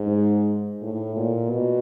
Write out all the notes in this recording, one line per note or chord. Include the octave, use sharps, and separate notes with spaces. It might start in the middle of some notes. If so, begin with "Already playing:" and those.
Already playing: G#2
A2
A#2
B2